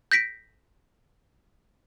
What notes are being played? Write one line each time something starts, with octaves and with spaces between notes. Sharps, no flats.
G6 A#6 B6 D7